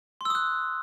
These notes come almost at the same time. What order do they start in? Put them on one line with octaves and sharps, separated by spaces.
C6 E6 D#6 F#6